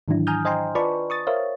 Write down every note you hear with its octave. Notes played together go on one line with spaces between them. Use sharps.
G#2 D#3 E3 F#3 D4 E4
G#5 A#5 D#6 F6 G6
C5 D#5 G5 G#5 A#5 C6
F4 B4 D5 A5 B5 C#6
C#6 D#6 A6
A#4 C5 C#5 E5 F5